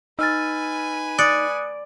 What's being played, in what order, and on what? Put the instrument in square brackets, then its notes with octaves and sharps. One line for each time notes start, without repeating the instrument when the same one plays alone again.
[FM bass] D#4 [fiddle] B4 G#5 [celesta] E6 F6 A6
[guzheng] D5 [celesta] D#6 F#6 C#7